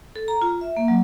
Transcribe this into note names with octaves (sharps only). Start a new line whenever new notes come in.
A4
A#5
F4
E5
A#3
F#3